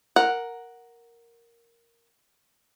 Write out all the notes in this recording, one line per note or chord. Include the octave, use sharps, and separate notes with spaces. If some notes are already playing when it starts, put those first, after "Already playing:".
A#4 F#5